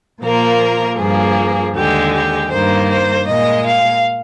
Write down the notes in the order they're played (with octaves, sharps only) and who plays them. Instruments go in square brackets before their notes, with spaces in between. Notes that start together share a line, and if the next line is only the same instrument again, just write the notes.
[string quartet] A#2 F3 A#3 A#4
G2 F3 A#3 G#4
D#2 D3 G#3 G4
G4
G2 D#3 A#3 C5
C5
A#2 G#3 D#5
F5